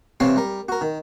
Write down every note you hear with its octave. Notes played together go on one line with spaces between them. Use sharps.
C3 E3 C4 C#5 F5
G3 A#4
F#4 A#4
D#3